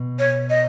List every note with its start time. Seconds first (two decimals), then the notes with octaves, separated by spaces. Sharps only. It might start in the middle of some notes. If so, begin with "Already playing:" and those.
Already playing: B2
0.19 C#5
0.50 D#5